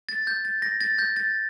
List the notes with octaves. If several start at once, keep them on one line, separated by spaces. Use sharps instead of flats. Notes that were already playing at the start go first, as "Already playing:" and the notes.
A6
G6
A6
A#6
A6
G6
A6